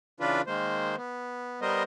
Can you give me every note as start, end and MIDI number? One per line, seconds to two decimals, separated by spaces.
0.20 0.41 49
0.20 0.41 52
0.20 0.41 62
0.20 0.41 65
0.20 0.41 71
0.47 0.96 51
0.47 0.96 56
0.47 0.96 58
0.47 0.96 72
0.96 1.60 59
1.62 1.83 55
1.62 1.83 59
1.62 1.83 70
1.62 1.83 72
1.62 1.83 75